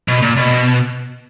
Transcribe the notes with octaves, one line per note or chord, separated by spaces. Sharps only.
B2
A#2
B2